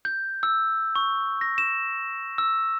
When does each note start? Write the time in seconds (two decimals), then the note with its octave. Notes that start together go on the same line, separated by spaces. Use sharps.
0.05 G6
0.43 E6
0.95 C#6
1.41 A#6
1.58 E7
2.38 E6